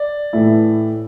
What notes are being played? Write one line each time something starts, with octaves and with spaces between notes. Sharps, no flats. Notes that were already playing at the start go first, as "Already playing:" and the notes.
Already playing: D5
A2 E3 A3 E4